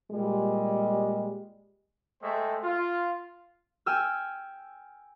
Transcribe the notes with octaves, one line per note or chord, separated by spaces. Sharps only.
A#2 G3 G#3
G#3 A3 C5 E5 G5
F4
G5 G#5 E6 F6